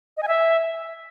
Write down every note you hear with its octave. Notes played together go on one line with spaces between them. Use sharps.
D#5
G#5
E5